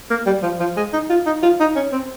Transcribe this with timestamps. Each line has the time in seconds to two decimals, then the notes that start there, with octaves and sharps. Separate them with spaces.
0.10 A#3
0.26 G3
0.43 F3
0.60 F3
0.77 G#3
0.93 D#4
1.10 F4
1.26 D#4
1.43 F4
1.60 D#4
1.76 C#4
1.92 C4